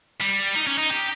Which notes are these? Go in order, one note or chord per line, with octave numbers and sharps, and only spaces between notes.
G3
D#4
C#4
D#4
G4